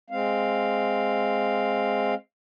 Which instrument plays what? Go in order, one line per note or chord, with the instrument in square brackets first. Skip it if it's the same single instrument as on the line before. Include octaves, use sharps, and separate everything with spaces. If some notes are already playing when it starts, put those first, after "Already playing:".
[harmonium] G#3 C4 F5